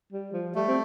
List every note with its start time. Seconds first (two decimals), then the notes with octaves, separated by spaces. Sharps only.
0.13 G3
0.33 F3
0.55 G3 A3
0.68 C4